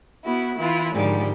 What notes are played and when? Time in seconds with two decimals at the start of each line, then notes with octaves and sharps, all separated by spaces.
0.25 B3 E4 F#4
0.58 E3 E4 F4
0.93 G#2 D3 D#3 F3 G3 G#3